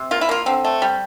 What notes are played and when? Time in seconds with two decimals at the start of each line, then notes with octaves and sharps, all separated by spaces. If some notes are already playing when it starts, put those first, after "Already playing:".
Already playing: C3
0.11 A#3 F4
0.21 E4
0.29 A#3 F4
0.46 D3 C4
0.65 A3
0.82 G3